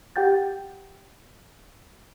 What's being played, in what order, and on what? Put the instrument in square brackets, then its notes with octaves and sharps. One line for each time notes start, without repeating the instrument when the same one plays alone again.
[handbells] G4 F#5 G5 G6 A6